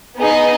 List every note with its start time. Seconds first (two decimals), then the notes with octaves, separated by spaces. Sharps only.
0.19 B3 D#4 G#4 D#5